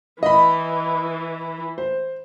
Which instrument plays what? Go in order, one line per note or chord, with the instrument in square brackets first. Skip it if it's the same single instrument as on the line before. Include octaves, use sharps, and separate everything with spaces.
[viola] E3 [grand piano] D#5 B5
[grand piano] C5